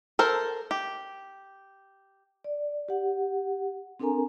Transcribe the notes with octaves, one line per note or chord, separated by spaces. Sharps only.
A4 A#4 C5
G4
D5
G4 F#5
C4 D4 A4 A#4 G#5 A#5